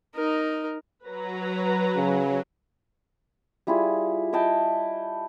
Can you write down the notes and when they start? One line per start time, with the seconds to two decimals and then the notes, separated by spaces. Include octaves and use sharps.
0.14 D#4 A#4
1.03 F#3 B4 A#5
1.97 C#3
3.67 G3 E4 F4 G#4
4.33 E4 D#5 G5 A5